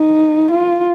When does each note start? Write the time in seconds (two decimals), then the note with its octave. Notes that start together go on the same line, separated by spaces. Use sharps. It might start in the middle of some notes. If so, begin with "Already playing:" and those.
Already playing: D#4
0.51 F4